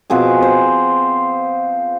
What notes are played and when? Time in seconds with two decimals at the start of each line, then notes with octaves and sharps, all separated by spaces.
0.10 B2 F3 C4 G#4
0.42 C5